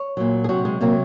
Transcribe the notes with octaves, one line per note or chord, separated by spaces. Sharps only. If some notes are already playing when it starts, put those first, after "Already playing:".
Already playing: C#5
A#2 F#3
G#4
C3 F#3 F#4
G#3
C3 F#3 A#3